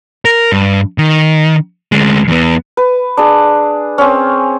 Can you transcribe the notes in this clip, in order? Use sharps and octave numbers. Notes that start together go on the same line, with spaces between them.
A#4
G2
D#3
D2 G#3
E2 B3
B4
D4 G#4
C4 C#4